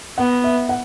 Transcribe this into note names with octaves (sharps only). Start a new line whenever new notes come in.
B3 F#5
E5
F#5